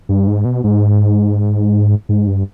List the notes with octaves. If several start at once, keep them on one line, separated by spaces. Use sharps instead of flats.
G2
G#2
B2
G#2
G#2
G2